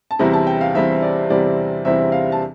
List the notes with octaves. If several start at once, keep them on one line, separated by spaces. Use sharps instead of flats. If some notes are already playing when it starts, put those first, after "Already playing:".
A5
E2 C3 G3 C4 E4 A#5
A5
G5
F5
E2 C3 G3 C4 E4 E5
D5
E2 C3 G3 C4 E4 D5
E2 C3 G3 C4 E4 E5
F5
A5